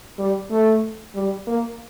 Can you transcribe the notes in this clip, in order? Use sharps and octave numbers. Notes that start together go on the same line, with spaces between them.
G3
A3
G3
A#3